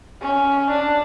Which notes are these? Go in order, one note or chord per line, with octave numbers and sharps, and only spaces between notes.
C#4
D4